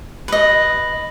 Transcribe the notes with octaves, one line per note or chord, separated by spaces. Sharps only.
B4 D#5